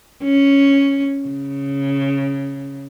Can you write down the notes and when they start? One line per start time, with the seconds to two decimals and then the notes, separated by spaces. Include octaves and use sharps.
0.23 C#4
1.29 C#3